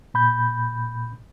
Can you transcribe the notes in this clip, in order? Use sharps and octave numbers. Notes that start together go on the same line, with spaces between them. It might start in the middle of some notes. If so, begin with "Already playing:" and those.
A#2 B5 G6